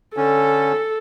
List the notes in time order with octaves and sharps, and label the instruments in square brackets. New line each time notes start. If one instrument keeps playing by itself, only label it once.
[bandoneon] D3 C#4 [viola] A4